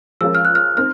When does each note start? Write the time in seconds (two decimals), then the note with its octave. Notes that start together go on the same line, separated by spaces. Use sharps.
0.21 F3 G#3 C#4 F4 A#4 E6
0.35 F6
0.45 F#6
0.55 F6
0.77 C4 D#4 F6